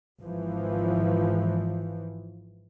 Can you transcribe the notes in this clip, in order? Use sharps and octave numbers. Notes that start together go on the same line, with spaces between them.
G#1 E3 F3